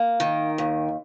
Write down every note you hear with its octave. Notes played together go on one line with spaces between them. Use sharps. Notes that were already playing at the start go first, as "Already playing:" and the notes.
Already playing: A#3
D#3
D#2